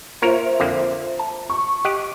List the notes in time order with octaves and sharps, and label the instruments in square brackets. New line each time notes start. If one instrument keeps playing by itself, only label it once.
[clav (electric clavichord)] A#3 A#4 C#5 [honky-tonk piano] F4 C5 E5
[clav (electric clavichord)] F2 D3 A#3
A5
[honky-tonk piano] C#6
[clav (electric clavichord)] G4 D#5 F#5